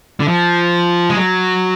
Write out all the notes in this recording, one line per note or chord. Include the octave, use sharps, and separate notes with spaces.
D3
F3
G#3
F#3